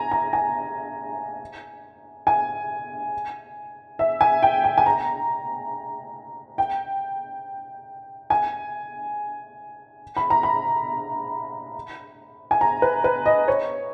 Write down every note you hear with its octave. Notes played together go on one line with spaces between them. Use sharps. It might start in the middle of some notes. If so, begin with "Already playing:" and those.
Already playing: G#5 A#5
A#5
G#5
G#5
E5
G#5
G5
G5
G#5
A#5
G5
G#5
B5
A#5
B5
G#5
A#5
B4
B4
D#5
C#5